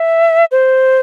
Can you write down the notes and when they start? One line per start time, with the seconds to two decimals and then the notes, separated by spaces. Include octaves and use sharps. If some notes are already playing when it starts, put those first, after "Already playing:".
Already playing: E5
0.51 C5